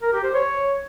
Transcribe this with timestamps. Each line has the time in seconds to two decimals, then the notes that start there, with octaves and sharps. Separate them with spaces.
0.02 A#4
0.13 G4
0.24 C5
0.34 C#5